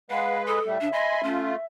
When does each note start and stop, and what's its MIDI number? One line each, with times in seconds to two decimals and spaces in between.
0.10 0.60 56
0.10 0.60 71
0.10 0.42 77
0.10 0.37 78
0.47 0.70 69
0.47 0.63 87
0.66 0.78 45
0.66 0.78 55
0.66 0.78 57
0.66 1.65 76
0.81 0.91 49
0.81 0.88 62
0.93 1.22 75
0.93 1.22 80
0.93 1.22 83
0.93 1.22 84
1.23 1.56 57
1.23 1.51 61
1.23 1.56 65